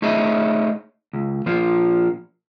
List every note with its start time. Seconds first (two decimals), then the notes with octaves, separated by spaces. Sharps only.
0.02 A3 D#4 G#4 C#5 D#5 E5
1.13 C#2
1.46 A#2 F3 A#3 F4